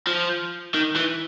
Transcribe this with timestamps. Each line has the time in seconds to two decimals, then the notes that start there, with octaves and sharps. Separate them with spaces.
0.07 F3
0.74 D#3
0.96 E3